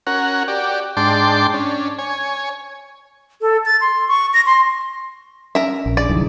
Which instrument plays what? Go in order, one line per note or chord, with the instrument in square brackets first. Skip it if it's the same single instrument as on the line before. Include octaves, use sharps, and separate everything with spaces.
[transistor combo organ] C#4 F#4 A#4 F#5
F#4 G4 D5
G#2 D4 G5 A5 C6 D6
C#4 D4
C#5 G#5
[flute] A4
A6
C6
C#6
A#6
C6
[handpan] C#4 [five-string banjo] A#4 E5
[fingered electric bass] A#1
[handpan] D4 G#4 [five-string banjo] D5
[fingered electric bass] C2 F#2 D3 [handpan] E3 F3 D#4